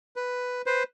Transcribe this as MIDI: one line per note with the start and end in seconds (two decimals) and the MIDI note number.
0.16 0.62 71
0.66 0.83 71
0.66 0.83 72